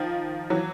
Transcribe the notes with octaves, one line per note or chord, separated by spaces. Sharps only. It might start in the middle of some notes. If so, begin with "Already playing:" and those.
Already playing: D#3 F3
E3 F#3